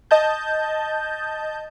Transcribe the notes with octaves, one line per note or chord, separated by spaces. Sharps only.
D#5 A5 G6